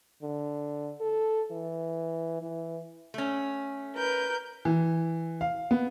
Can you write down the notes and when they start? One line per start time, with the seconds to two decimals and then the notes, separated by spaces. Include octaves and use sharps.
0.23 D3
1.01 A4
1.51 E3
2.42 E3
3.14 A3 C#4
3.96 A#4 B4 G6
4.65 E3
5.41 F5
5.71 B3